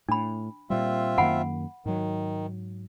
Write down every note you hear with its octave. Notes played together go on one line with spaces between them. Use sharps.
A2 D4 B5
A#2 G3 C4 F4 E5
F#2 D#3 A#3 F#5 G#5 B5
G#2 D#3 F#3